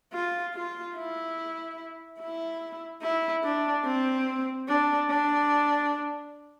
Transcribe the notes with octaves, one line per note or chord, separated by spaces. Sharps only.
F4
F4
E4
E4
E4
D4
C4
D4
D4